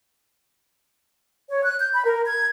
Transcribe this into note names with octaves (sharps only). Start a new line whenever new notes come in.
C#5
F#6
G6
B5
A#4
G#6